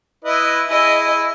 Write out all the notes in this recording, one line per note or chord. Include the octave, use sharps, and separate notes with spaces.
E4 B4 D#5
E4 G#4 D#5